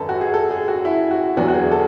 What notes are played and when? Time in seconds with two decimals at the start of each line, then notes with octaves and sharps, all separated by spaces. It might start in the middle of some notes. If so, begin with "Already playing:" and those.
Already playing: G#1 F#2 D4 A4 B4
0.09 F#4
0.21 G#4
0.34 A4
0.51 G#4
0.68 F#4
0.85 E4
1.11 F#4
1.37 E2 D3 F#3 B3 D4 F#4
1.48 F#4
1.54 G#4
1.71 A4